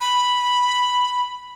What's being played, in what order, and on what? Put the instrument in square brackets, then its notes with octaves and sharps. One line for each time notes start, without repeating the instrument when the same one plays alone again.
[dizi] B5